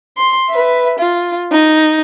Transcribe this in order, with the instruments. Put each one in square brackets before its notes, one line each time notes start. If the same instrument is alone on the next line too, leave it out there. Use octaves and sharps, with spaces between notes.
[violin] C6
B4 E5
F4
D#4